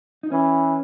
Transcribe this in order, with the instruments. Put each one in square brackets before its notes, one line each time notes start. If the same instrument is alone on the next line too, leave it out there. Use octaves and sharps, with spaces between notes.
[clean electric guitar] D#4
[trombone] E3 [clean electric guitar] C#4